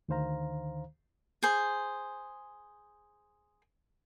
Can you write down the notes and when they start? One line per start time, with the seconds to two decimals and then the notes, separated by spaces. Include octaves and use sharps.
0.08 D2 D3 D#3 C5 F5 A#5
1.43 G#4 C5